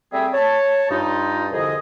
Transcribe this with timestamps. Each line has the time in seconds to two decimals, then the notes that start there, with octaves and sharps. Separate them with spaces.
0.12 G3 A3 C4 G#4 E5 G5
0.34 C#5 A5
0.90 G2 D#4 F4
1.52 C2 F2 D3 G#4 D#5